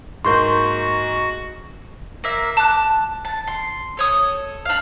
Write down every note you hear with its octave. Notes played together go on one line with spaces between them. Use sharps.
G#2 A#3 F#4 C6 C#6 G6
A#3 E5
A5 D6 F#6
A5
C6
A4 C#5 D#6
D4 F5